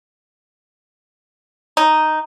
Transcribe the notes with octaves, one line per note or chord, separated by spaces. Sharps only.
D#4